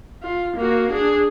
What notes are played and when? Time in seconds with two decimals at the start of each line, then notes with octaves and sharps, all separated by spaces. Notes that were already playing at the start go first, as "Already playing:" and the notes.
0.23 F4
0.56 A#3 F#4
0.91 D4 G#4